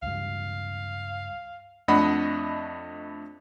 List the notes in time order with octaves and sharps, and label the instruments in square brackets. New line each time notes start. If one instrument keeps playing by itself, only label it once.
[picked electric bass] C#2 G2 [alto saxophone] F5
[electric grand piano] F2 A3 D4 D#5 F#5 B5